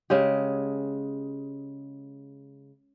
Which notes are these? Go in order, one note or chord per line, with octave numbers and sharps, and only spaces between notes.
C#3 G#3 G4